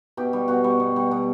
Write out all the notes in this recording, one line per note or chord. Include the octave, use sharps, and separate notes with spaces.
B2 G4
G3
B2 F#4
G3
B2
G3
B2